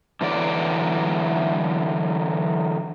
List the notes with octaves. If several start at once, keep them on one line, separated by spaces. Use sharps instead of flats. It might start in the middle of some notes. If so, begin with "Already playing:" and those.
D3 E3 F#3 D5